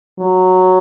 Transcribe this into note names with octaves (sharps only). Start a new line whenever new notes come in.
F#3